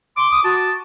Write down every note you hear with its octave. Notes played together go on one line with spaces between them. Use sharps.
C6 D6
D#6
F#4 A5